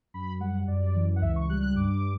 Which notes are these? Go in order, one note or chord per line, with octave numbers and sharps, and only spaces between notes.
F#2 B5
G3 F#5
F#2 D5
E3
F#5
C#2 E5
C#6
G3 F#6
F#6
G2 D6